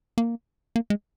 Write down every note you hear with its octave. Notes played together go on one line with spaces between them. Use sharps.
A#3
A#3
G#3